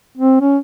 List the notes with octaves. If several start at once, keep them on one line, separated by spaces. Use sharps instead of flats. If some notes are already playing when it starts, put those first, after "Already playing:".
C4
C#4